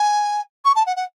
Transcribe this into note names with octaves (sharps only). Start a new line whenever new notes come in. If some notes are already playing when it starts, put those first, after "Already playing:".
Already playing: G#5
C#6
A5
F#5
F#5